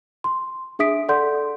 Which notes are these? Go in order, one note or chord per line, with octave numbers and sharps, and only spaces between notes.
C6
D4 G#4 E5 D#6 B6 D7
A4 D5 F#5 C6 G6